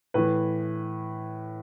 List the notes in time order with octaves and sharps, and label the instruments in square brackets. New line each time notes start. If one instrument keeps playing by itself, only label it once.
[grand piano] A2 E3 B4